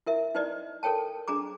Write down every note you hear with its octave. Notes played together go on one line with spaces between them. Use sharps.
E4 A#4 E5
D#4 E4 B4 D5 D#5
A4 A#4 C#5 G5 A5
D4 G#4 A#5 D6